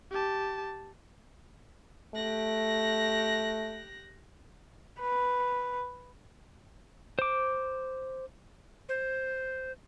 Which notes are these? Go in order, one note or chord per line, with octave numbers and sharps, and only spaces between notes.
G4 A5
A3 G4 F#6 A#6
B4
C5 D6
C5